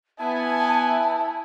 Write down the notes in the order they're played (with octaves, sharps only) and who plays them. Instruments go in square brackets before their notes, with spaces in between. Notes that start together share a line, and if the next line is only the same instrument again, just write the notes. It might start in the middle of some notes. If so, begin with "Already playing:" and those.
[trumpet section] B3 G#5 [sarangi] E4 [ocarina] A5